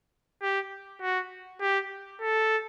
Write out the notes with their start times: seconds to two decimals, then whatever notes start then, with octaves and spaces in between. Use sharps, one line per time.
0.42 G4
1.02 F#4
1.61 G4
2.21 A4